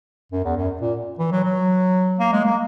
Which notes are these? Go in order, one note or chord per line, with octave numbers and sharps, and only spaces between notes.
F#2
E2
F#2
A#2
E3
F#3
F#3
A#3
G#3
A#3